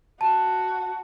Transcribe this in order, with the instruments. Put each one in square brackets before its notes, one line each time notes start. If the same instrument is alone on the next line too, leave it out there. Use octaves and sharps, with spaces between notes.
[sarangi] F#4 [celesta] A5